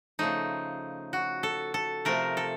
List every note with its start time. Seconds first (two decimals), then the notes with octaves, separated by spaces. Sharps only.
0.19 C#3 F3 A3 D#4
1.13 F#4
1.43 A4
1.74 A4
2.05 C3 F3 A3 A#4
2.37 A4